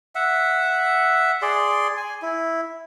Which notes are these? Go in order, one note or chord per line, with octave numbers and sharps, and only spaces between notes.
E5 F#5
G#4 D5 C6
G#5
E4